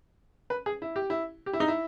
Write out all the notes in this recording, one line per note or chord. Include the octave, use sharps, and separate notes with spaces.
B4
G#4
E4
G4
E4
G4
E4
D#4
E4